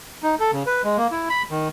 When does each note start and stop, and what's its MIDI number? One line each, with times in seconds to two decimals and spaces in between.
0.23 0.35 63
0.40 0.51 69
0.52 0.63 49
0.66 0.82 71
0.84 0.97 56
0.97 1.07 58
1.11 1.29 64
1.30 1.43 83
1.50 1.68 51